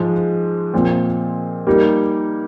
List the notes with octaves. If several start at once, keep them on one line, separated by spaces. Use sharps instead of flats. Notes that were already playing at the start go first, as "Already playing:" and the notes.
Already playing: G#2 F3 G#3
A#2 F3 C4
G3 A#3 D#4